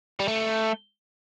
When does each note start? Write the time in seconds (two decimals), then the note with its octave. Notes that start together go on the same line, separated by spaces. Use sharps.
0.20 G3
0.28 A3